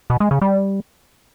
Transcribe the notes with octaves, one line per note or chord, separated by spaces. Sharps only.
B2
G#3
C#3
G3